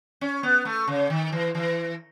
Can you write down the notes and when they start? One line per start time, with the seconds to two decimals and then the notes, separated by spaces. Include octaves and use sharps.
0.21 C#4
0.43 B3
0.65 A3
0.87 C#3
1.10 D#3
1.32 E3
1.55 E3